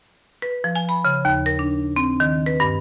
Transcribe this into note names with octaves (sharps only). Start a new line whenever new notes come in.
B4
F3
G#5
B5
C#3
D#2
A#4
D4
C4
D#3
B4
G2